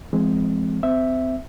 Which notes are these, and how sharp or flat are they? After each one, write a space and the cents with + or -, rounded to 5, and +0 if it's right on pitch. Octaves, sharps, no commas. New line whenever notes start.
F3 -45 G#3 +0 C4 +0
C4 -30 E5 +0